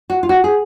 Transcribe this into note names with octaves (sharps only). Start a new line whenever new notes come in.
F#4
F4
F#4
G#4